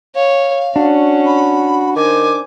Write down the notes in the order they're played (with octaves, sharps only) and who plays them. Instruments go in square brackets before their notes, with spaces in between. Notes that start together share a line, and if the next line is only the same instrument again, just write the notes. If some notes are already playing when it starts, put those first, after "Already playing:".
[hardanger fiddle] C#5 [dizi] F5
[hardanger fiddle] C#4 [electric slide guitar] D4 [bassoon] F#4
[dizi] B5
[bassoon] D#3 [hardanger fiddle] C5 G#5 [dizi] D6